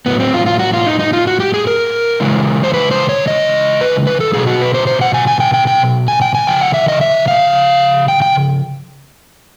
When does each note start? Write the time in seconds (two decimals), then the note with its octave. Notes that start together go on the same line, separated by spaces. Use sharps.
0.06 A2 F#3 B3
0.20 C4
0.34 F4
0.46 F4
0.59 F#4
0.73 F4
0.86 D#4
0.99 D#4
1.13 F4
1.27 F#4
1.40 G4
1.54 G#4
1.67 A#4
2.20 C#3 E3 G#3
2.64 C5
2.74 B4
2.91 C5
3.09 C#5
3.28 D#5
3.81 B4
4.07 B4
4.20 A4
4.33 B2 F#3 G#4
4.47 F#4
4.61 B4
4.74 C5
4.87 C5
5.01 F#5
5.14 G#5
5.27 G#5
5.40 G5
5.54 G5
5.67 G5
6.08 G#5
6.22 G5
6.35 G#5
6.47 C#3 F3 G5
6.61 F#5
6.74 E5
6.88 D#5
7.01 E5
7.28 F5
8.08 G5
8.22 G5